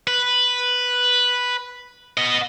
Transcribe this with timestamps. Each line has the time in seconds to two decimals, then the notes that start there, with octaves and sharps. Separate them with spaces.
0.07 B4
2.17 B3 D#5